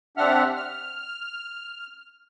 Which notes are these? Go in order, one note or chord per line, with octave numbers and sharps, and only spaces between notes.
C3 C4 D4 E5 F#5 F6
F6